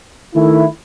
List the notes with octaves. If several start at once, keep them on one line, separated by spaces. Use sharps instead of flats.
D#3 A3 E4